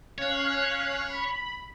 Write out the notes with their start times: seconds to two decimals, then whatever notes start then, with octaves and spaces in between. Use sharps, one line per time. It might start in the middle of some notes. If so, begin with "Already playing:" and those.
0.18 C#4 C#5 F5 F#6
1.07 B5